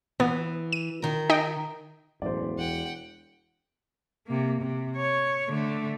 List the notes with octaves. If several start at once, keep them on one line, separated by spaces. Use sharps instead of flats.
E3 B3
D#7
D#3 A#4
D#4 D#5 G5
E1 F#2 A2 E3 C5 D5
E2 F#5 G5
C3 A#3
C3
C#5
D3 A3